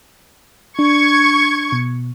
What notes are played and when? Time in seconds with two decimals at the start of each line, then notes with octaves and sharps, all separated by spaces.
0.79 D4 C#6 G#6
1.72 B2